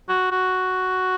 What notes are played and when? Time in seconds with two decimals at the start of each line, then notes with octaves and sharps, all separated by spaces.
0.09 F#4
0.31 F#4